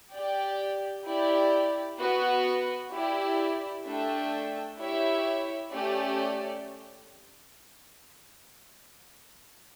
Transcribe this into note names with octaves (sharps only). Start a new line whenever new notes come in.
G4 D5 G5
E4 G4 D5
B3 F#4 B4
E4 G4 D5
A3 D4 A4 E5 G5
E4 G4 C#5 E5
A3 C#4 G4 D5